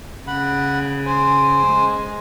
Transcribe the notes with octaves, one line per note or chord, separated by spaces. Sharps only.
C#3 F#5 B5
C5 G#5
G#3